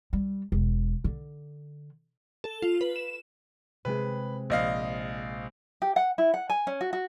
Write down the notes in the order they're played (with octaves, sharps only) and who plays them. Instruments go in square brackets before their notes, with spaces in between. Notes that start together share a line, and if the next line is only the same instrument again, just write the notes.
[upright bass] G3
E1
D3
[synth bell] A4
F4
B4
E7
[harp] C3 G#3 G#4 [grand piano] B4
[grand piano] A#1 D#5 F5
[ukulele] G4
F#5
E4
F#5
G#5
C#4
F#4
F#4